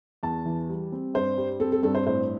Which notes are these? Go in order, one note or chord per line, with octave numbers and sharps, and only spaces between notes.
E2 A5
E3
G3
C4
G2 C5
G3
C4 A4
A4
G2 A4
C5
A2 C5